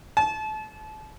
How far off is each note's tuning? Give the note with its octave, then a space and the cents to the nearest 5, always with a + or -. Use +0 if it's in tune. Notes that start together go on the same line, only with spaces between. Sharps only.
A5 -30